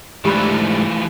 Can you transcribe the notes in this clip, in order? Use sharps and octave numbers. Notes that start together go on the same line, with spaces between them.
G#2 E3 F3 A3 D4 G4 B5